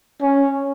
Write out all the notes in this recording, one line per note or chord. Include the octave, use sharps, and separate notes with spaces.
C#4